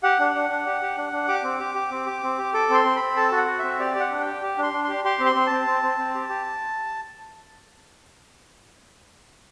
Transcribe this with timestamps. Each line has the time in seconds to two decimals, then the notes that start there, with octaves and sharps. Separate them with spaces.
0.03 G4 F#5
0.19 D4
0.35 D4
0.49 D4
0.66 G4
0.82 G4
0.97 D4
1.12 D4
1.28 G4 D6
1.43 C4
1.60 G4
1.75 G4
1.91 C4
2.06 G4
2.23 C4
2.38 G4
2.54 A4 D6
2.70 C4 C6
2.85 C4
2.96 C4 B5
3.16 A4 A5
3.32 F#4
3.37 F#5
3.47 F#4
3.59 C4 E5
3.79 G4 D5
3.95 G4
4.00 F#5
4.11 D4
4.21 G4 G5
4.42 G4
4.58 D4 C6
4.73 D4
4.84 G4 C6
5.04 G4 C6
5.20 C4
5.26 C6
5.35 C4
5.47 C4 A5
5.67 C4
5.83 C4
5.98 C4
6.15 G4
6.29 G4